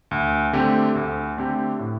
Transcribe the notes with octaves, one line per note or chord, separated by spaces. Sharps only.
D2
D3 A3 C4 G4
D2
D3 A3 C4 G4
A2